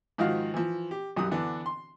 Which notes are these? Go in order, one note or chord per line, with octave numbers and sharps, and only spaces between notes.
G#2 D#3 F3 F4 F#4 F5
E3 F3
G4
B1 F#2 F#3 G3 D#6
D3 E3 B3 D4
C6